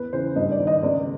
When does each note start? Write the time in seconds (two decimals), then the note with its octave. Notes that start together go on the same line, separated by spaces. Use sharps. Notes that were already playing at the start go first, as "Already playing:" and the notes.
Already playing: E2 B4
0.13 C#3 E3 C5
0.36 G2 D#5
0.51 D5
0.59 D#3
0.67 D#5
0.82 C#2 D5